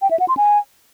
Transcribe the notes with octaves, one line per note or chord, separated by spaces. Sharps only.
G5
E5
F#5
C6
G#5